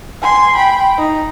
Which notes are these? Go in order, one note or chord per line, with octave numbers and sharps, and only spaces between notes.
G#5 C6
G5 B5
D#4